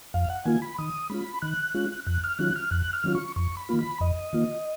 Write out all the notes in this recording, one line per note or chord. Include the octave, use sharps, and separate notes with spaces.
F2 F5
F#5
D#3 A#3 F4 G#5
B5
D#3 D#6
G#3 C#4 F4 B5
D#3 F#6
G#3 C#4 F4
F2 F#6
F6
D#3 F#3 C#4 F4 F#6
F6
F2 F#6
F6
D#3 F#3 C#4 F4
C#6
F2 C#6
B5
D#3 A#3 F4
B5
F2 D#5
D#3 A#3 F4